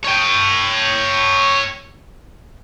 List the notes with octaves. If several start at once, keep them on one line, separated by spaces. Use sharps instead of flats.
C#5 G5